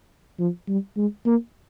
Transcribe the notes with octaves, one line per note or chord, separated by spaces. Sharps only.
F3
G3
G#3
A#3